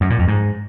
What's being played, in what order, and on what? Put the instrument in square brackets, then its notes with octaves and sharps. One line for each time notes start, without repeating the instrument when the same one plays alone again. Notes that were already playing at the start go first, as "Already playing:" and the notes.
[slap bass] F#2
A#2
F2
G#2